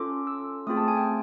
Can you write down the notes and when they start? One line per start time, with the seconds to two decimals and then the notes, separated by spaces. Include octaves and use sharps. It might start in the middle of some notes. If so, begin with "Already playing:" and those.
Already playing: C#4 F4 A4 D6
0.27 E6
0.67 A3 C4 F4 G#4 D#6
0.77 A5
0.88 G#5
0.97 G5